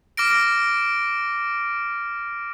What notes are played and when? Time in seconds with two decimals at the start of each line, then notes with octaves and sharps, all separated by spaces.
0.17 D6 F6 A#6 D7